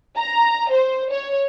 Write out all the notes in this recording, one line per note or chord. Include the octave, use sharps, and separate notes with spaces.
A#5
C5
C#5